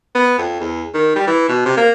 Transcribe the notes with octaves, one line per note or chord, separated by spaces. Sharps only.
B3
F2
E2
D#3
G3
E3
B2
C3
A#3